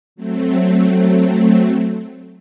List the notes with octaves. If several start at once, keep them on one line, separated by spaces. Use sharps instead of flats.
F#3 A3 C4